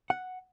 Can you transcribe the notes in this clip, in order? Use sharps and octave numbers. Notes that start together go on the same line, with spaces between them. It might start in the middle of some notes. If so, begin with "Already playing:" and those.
F#5